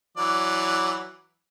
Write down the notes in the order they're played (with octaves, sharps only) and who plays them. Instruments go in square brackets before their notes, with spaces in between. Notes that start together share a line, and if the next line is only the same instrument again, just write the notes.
[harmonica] E3 F#3 D5